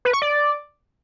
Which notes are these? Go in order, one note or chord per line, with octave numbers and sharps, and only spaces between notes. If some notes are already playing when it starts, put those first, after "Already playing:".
B4
C#6
D5